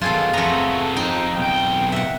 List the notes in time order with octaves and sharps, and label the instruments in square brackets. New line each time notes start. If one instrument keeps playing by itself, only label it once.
[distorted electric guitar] F#2 B2 [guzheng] F4 G#4 A4
[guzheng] F2 A#5 [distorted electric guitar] A3 B3
[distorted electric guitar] F3 G5 [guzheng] D#4
[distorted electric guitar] B1 G5
[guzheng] E5 F#5